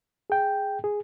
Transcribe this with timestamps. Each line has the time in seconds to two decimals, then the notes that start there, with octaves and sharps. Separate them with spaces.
0.30 G#4 G5
0.84 G#4